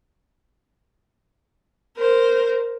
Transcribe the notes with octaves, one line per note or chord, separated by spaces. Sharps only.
A#4 C5